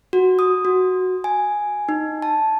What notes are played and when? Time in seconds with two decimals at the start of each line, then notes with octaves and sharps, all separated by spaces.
0.13 F#4
0.39 D#6
0.65 F#4
1.24 G#5
1.89 D#4
2.22 A5